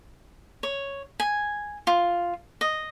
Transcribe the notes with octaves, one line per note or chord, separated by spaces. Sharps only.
C#5
G#5
F4
D#5